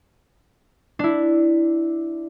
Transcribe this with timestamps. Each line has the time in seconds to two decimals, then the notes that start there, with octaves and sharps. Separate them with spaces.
0.99 D4 E4